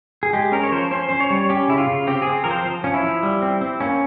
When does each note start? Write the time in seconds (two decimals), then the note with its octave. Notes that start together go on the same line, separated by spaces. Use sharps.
0.23 G#4
0.33 G#3 G4
0.52 C#4 A#4
0.63 C#5
0.72 F3 C5
0.91 C#4 C5
1.09 C#4 C5
1.20 C#5
1.30 G3
1.50 C#4 G4
1.68 C#3 E4
1.78 F4
1.87 C#3
2.07 C4 G4
2.22 C4 G#4
2.44 F3 A#4
2.51 C5
2.65 F3
2.84 F3 C#4
2.94 E4
3.04 F3
3.23 G3
3.42 C4
3.61 C4
3.80 A#3 C#4